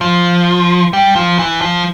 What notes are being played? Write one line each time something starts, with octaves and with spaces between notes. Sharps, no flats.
F3
G3
F3
E3
F3